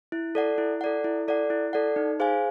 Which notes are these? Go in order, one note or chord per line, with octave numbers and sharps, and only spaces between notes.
E4
A4 D5 F#5
E4
A4 D5 F#5
E4
A4 D5 F#5
E4
A4 D5 F#5
D#4
G#4 C5 F5 G#5